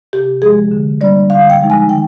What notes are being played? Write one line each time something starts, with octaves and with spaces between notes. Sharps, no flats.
C3 G4
F3 G#3 G#4
D3
G3 A#3 D4 D5
D3 F5
G5
F3 G#3 D#4
G#5
D#3 G5